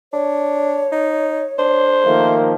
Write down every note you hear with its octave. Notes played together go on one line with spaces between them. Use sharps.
D4 C#5
D#4
D4 C5
D#3 F3 A3 A#3